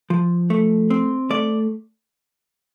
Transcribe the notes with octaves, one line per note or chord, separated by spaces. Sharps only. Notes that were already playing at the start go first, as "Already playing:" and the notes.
F3
A3
C4
A3 D5